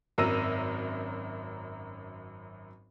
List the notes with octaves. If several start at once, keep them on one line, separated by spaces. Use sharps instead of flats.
G#1 F#2 A#4 E6 A#6 D#7